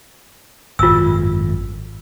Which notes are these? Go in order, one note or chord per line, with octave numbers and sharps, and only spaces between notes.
G#1 F#2 A2 F4 E6